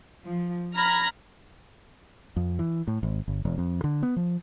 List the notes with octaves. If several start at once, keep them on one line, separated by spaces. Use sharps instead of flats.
F3
A#5 B5 F6 G#6 A#6
F2
E3
A2
G#1
G1
E1
F2
D3
B3
F3